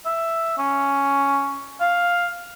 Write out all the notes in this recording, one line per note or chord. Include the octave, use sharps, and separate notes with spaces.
E5
C#4
F5